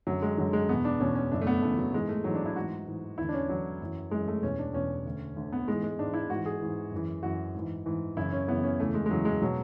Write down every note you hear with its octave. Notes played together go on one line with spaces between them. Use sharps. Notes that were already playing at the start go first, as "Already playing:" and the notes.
F#2 D3 F#3
G#3
F#2 D3 F#3
G#3
E2 B2 B3
D4
E2 B2 C#4
C#4
F#2 C#3 E3 D4
A3
B3
F#2 C#3 E3 A3
F#3
G#2 E3 G#3
A3
G#2 E3 F#3
D4
E4
G#2 E3 F#4
G#2 E3
E2 D3 E4
D4
C#4
E2 D3 F#3
F#2 E3
F#2 E3 G#3
A3
E2 B2 C#4
D4
E2 B2 C#4
D2 D3
D2 D3
B3
G#2 E3 G#3
G#3
G#2 E3 D4
E4
G#2 E3 F#4
G#4
G#2 E3
F#2 E3
F#2 E3 F#4
G#2 E3
G#2 E3
F#2 C#3 E3 E4
C#4
F#2 C#3 E3 B3
C#4
E2 C#3 E3 A3
G#3
G#3
E2 C#3 E3 F#3
G#3
B2 F#3